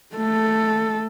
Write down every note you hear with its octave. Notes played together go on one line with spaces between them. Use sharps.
A3 A4